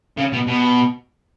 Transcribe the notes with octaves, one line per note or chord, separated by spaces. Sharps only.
C#3
B2
B2